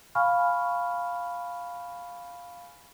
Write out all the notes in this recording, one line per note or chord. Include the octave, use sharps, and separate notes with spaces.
F5 G#5 B5 C#6 F6